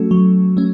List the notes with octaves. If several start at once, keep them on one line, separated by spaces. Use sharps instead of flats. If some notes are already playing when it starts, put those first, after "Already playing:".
Already playing: F#3 A3 C#4 F#4 A4
F#3
A3 C#4